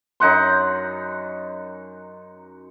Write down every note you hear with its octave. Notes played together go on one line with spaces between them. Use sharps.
F#2 D#4 F#5 C6